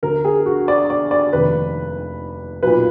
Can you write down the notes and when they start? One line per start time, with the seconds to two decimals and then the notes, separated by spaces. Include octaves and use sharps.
0.03 D2 D3 A#4
0.25 G#4
0.46 F#4
0.68 D5
0.90 D5
1.11 D5
1.33 F1 D#2 D#3 B4
2.63 B1 A#2 B4